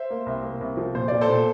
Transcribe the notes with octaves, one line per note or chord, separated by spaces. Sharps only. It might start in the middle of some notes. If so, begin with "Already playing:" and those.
Already playing: C5 E5
A#3
C2
A#3
C2
F3
A#2 C5
A#2 D5
A4 C5
A#2